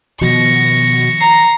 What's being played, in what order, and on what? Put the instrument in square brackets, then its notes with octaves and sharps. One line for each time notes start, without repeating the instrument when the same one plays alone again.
[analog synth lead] B2 [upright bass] D#3 F3 [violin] C#6 A#6
[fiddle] A#5 [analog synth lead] C7